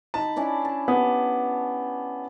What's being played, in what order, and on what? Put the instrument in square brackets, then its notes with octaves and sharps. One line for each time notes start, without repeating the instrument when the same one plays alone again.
[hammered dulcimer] D#4 B5 [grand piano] A5
[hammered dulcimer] C#4 D4 E4
A5
[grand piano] B3 [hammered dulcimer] G4